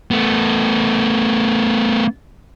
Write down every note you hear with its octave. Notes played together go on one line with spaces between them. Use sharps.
A3 B3